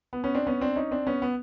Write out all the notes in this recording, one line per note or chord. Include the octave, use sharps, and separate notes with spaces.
B3
B3 C#4
C4 D4
B3 C#4
C4 D4
C#4 D#4
C4 D4
B3 C#4
B3